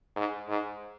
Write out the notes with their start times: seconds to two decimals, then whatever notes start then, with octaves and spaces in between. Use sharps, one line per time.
0.16 G#2
0.49 G#2